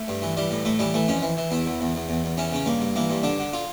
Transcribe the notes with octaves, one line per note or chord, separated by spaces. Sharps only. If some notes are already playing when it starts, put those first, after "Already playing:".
Already playing: A3
G2
E3
E3 G3
A2
A2 A3
E3 G3
E3 A3
F2 C#4
E3
E3
E2 E4
E2
E2
E2
E2
E2
E3 C#4
C#3 C#4
G2 A#3
G2
E3 A#3
G2
D3 D4
D3
F4